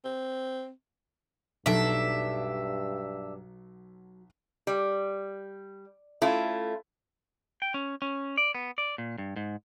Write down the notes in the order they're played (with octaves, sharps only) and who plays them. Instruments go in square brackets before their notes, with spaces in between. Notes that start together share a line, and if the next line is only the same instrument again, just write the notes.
[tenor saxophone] C4
[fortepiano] B1 A4 [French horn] G2 [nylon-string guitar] F#3 [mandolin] D4 E5
[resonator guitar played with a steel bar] G3
A3 C#4 E4 F4
[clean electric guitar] G5
C#4
C#4
D5
B3
D5
A#2
G2
G#2